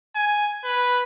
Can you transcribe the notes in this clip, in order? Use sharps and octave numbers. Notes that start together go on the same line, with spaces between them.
G#5
B4